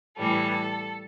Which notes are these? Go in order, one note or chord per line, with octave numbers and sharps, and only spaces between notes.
A2 E3 G3 A4